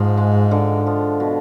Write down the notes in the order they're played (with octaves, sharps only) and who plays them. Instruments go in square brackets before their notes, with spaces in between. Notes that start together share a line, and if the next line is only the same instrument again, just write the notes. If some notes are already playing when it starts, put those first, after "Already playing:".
Already playing: [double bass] G#2 [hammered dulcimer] F3
[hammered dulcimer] G#3
D3
F3
B2